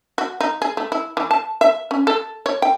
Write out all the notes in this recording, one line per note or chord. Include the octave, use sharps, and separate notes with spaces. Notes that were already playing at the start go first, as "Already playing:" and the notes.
F#4
D#4
G#4
A3
E4
E3
A5
E5
C#4
A4
C#5
G5